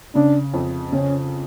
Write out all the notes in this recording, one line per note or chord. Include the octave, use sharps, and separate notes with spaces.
C#3 D4
F2
C#3 C#4